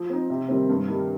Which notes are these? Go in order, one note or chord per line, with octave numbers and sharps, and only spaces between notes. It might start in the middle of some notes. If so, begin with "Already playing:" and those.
Already playing: F3
C4 D#4
C3
D#3 G3 C4
G2
D#3 G3